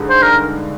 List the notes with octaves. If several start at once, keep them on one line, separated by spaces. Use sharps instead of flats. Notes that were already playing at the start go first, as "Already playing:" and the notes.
Already playing: G2 D3 G#3 D#4 G#4
C5
A#4